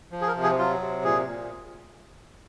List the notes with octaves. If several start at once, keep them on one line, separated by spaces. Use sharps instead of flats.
F3
G#4
A#4
C3
G#4
F#3 F4
C3
A#2 G#4
A#2